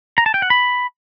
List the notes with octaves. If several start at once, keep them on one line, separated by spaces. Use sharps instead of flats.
A#5
A5
G5
F#5
B5